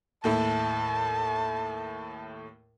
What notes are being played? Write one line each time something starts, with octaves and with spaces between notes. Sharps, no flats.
D#2 A2 E4 A5